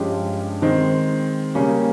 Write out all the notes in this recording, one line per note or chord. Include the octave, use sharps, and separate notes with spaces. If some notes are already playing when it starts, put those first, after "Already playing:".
Already playing: G2 F3 G#3 C#4 G4
D#3 G#3 C4
C#3 G3 A#3 C#4